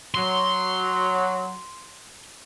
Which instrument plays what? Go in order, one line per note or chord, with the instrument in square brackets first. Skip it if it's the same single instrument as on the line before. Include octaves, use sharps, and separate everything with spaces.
[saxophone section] F#3 [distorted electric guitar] C6